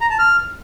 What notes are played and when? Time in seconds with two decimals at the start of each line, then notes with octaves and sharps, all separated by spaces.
0.01 A#5
0.10 A5
0.19 F6